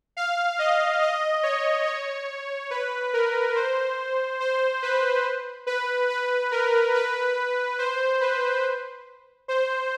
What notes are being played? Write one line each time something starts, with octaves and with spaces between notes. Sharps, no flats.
F5
D#5
D#5
C#5
C#5
B4
A#4
C5
C5
B4
B4
B4
A#4
B4
C5
B4
C5